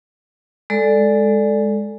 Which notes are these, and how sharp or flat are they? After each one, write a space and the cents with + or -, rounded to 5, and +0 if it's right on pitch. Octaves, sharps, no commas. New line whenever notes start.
G#3 +0 A4 +0 D5 +0